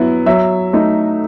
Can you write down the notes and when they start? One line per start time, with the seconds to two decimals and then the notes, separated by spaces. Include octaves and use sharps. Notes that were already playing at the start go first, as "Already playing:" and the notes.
Already playing: F#3 B3 E4
0.26 F#3 E5
0.73 A3 D#4